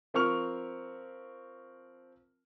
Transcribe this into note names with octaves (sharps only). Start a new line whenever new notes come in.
F3 C4 A#4 C#6 F6 F7